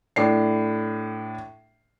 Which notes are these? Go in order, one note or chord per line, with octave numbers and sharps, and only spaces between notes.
A2 D4 C7